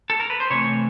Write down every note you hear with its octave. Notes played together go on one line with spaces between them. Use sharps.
A4
A#4
B4
C5
C3 E3 A3 C#5